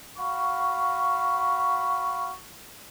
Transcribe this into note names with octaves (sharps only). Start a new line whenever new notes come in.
F#4 F5 B5 C#6